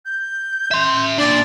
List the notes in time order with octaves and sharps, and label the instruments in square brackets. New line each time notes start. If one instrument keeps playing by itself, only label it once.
[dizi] G6
[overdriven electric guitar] E5 C6
[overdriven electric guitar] A#2 D4 [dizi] D5